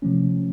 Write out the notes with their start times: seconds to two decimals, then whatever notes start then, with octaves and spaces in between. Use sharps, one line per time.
0.02 C3 F3 A3 C#4